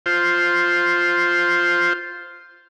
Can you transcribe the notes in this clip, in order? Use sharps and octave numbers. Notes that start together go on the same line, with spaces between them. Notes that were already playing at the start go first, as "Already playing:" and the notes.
F4 C5